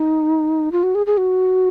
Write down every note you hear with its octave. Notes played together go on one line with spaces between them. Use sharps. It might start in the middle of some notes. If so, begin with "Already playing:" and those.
Already playing: D#4
F4
F#4
G#4
G#4
F#4